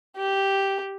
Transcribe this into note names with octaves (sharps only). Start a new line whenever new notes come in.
G4